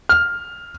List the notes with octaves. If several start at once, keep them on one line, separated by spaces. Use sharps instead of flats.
F6